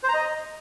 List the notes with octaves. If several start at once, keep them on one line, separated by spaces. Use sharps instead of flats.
C5
A#5
D#5